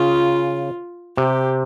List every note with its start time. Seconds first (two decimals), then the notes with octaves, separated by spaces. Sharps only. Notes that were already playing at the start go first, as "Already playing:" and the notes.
Already playing: C#3 F4
1.17 C3 G4